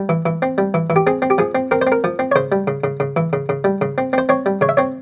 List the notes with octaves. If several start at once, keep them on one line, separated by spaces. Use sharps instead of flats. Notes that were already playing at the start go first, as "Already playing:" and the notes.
Already playing: G3
E3
E3
C4
G3
E3
E3
G4
C4 G#4
C4
G4
F3 G#4
C4
C4 A#4
C5
C4
A#4
F3
C4
C#5
C#3 C5
G3
C#3
C#3
C#3
E3
C#3
C#3
G3
C#3
C4
C4 C5
C4 C#5
G3
C#3 C#5
E5
C4 C#5